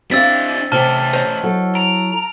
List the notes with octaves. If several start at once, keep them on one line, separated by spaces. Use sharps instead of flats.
C4 D4 E4 G4 F5 E6 A6 B6
C3 A3 C#4 A5 F6 G7
C5 C#5 D#5
F#3 E4 A4
A#5 D7 F7